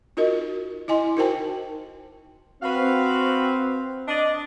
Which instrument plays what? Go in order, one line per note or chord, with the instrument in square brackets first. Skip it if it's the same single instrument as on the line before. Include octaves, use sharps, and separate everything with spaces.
[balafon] D#4 F4 F#4 A#4 D#5
E4 D#5 G#5 C6
D#4 F#4 A#4 C5 G5 A5
[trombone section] C4 [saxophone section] F#4 B4 F5
[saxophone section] D4 D5 D#5